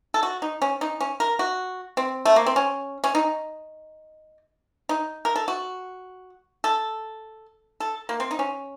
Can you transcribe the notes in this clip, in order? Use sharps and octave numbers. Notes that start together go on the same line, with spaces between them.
A4
F#4
D#4
C#4
D#4
C#4
A#4
F#4
C4
A3
A#3
C4
C#4
C#4
D#4
D#4
A#4
A4
F#4
A4
A4
A#3
C4
D#4
C#4